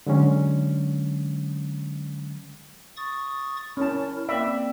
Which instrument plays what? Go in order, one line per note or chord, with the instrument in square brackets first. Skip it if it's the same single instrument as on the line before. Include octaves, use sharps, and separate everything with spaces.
[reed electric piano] D3 F#3 G#3 C#4
[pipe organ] C#6 D#6 A6
[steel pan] C#4 A5 [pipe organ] E4 A#4
[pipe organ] A#3 C4 G5 [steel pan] D5 E5 B5